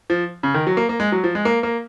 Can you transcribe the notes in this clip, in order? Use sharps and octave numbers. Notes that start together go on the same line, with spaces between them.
F3
C#3
D#3
F#3
A#3
A#3
G#3
F#3
F3
G#3
A#3
A#3